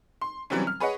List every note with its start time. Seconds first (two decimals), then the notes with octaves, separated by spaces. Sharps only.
0.21 C6
0.50 C3 E3 F#3 G3 C4 C#4
0.67 F6
0.80 G#4 B4 C#5 D#5 F#5